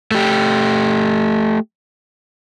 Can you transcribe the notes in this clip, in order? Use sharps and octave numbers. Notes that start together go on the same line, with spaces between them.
A3 G4